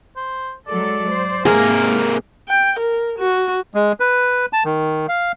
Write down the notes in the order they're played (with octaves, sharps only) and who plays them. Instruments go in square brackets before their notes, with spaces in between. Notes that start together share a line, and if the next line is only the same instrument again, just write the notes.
[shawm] C5
[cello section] F#3 G#3 A4 [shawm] D5
[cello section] C5
[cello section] G#2 [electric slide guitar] C3 A#3 A#4 [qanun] G#4 [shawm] F5
[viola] G5
A#4
F#4
[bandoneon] G#3
B4
A5
D#3
F5